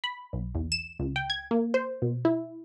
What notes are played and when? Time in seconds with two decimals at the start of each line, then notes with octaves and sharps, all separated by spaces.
0.04 B5
0.33 B1
0.55 E2
0.72 E7
0.99 C#2
1.16 G5
1.30 G#6
1.51 A#3
1.74 C5
2.02 B2
2.25 E4